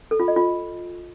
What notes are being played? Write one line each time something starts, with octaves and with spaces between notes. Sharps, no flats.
A4
F4
D#5
F4